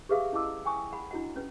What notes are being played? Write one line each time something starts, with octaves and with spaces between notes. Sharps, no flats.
G4 G#4 B4 E5 F5 D#6
C#4 E4 D#5 A5 D6 E6
G5 G#5 C#6 D#6
F#5 B5
D4 E4 F#4 D#5 F#5
C#4 B4